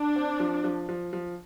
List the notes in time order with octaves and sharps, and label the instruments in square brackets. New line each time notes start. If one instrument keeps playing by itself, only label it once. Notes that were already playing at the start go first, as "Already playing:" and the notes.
Already playing: [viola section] D4
[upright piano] C4
F3
F3
F3
F3